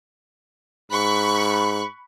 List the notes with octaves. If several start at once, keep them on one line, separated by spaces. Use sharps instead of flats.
G#2 B5 C#6 F#6